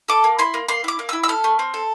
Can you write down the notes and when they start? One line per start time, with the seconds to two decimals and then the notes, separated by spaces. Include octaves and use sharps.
0.08 A4 D6
0.24 A#3
0.39 E4 C6
0.54 A#3
0.68 A#3 C6
0.84 E4 D6
0.99 A#3
1.09 E4 E6
1.24 E6
1.28 A4 F6
1.44 A3
1.59 C4
1.74 A4